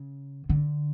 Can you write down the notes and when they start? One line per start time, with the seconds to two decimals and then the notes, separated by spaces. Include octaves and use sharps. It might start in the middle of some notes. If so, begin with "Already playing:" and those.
Already playing: C#3
0.49 D3